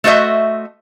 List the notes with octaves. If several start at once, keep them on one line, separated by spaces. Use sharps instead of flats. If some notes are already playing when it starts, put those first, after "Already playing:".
A3 F#4 C5 D#5 E5